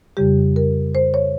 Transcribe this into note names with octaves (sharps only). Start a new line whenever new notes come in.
F2 C#3 G3 G4
A#4
C5
C#5